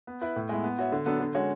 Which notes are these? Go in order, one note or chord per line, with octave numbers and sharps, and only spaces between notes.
B3
E4 B4
A2
G#3 B3 E4
B3
F#4 C#5 E5
D3
F#3 B3 D4 A4
D3
G#3 C#4 F#4 C#5